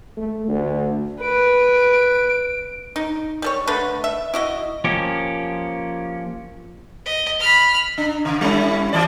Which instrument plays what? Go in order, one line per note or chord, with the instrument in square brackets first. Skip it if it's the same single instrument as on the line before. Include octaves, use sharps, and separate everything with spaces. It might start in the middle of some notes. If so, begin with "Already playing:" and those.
[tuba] A3
D2
[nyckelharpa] B4 [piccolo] D7
[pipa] D#4
G3 A4 C#5
D3 A3 A4 B4
E5
E4 F#4 D#5
[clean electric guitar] F3 A#3 C#4 G4
[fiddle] D#5
B5 F6
[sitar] D4
C#3
G3 C#4 E4
E3 D5